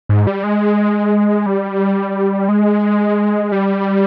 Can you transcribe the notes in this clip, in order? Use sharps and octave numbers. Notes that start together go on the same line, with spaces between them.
G#2
G3
G#3
G3
G#3
G3